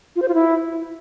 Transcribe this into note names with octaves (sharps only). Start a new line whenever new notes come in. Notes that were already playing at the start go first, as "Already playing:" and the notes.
F4
C5
F4
E4